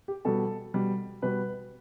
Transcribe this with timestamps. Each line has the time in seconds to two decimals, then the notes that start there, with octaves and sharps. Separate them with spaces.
0.08 G4
0.25 B2 G3 A4
0.74 B2 G3
1.22 B2 G3 B4